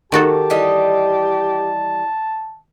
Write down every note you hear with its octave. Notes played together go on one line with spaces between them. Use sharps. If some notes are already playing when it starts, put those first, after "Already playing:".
D#3 F#4 G4 A4 A5
E3 G3 D#5